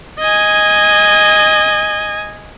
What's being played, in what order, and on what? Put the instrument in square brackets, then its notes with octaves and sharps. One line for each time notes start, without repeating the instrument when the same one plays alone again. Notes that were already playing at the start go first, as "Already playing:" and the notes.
[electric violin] D#5 G#5